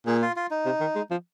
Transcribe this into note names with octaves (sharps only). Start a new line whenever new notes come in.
A#2 G#4
F4
F4
D#4
C3
D#3
G#3
F3